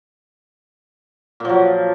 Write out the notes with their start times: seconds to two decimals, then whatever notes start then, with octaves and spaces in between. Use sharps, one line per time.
1.40 A#2
1.45 F3
1.49 F#3